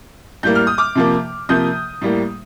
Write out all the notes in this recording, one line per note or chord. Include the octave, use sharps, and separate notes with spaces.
A2 G3 A#3 G6
F6
D#6
D6 F6
C3 F3 A#3
C3 F3 A#3 D#6 G6
A2 G3 A#3